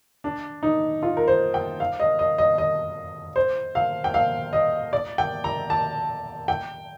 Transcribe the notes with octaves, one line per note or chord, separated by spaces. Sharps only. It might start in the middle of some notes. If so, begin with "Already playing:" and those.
D4
D#4
F4
A#4
C5
G5
F5
D#5
D#5
D#5
D#5
C5
F5
G5
F5
D#5
D5
G5
A#5
A5
G5